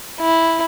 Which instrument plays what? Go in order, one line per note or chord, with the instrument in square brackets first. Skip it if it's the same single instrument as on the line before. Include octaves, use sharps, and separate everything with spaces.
[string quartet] E4